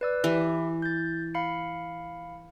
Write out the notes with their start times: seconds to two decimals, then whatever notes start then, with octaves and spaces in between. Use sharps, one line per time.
0.01 B4 D5 E6
0.24 E3 E4 G4 E5
0.82 G6 A6
1.34 F5 B5 C#7